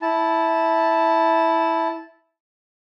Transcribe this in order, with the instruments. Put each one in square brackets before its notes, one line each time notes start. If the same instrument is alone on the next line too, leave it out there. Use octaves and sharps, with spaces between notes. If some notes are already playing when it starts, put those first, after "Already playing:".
[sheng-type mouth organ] E4 A5